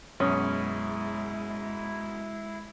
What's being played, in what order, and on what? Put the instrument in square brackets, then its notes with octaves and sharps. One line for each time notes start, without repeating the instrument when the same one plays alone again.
[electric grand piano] F#2 B2 D#6 [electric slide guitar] G#3 [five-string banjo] C#4 [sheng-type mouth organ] E4